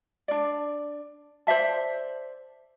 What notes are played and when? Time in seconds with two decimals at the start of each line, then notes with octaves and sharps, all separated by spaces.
0.28 D4 D5
1.47 C5 D5 E5 A5